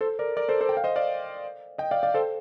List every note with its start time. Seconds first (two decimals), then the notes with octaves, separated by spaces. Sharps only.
0.01 A4 C5
0.19 A#4 D5
0.37 A#4 D5
0.48 A4 C5
0.61 A4 C5
0.69 G5
0.77 F5
0.84 C5 D#5
0.96 D5 F5
1.78 D#5 G5
1.91 D5 F5
2.03 D5 F5
2.14 A4 C5